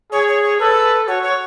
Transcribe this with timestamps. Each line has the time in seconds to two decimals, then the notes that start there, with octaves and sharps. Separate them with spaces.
0.12 G#4 C#5
0.27 C#5
0.43 C#5
0.59 A4 B4
1.08 F#4 C#5
1.23 C#5